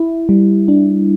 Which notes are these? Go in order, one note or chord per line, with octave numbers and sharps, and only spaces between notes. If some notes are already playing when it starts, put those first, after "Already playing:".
Already playing: E4
G3
D4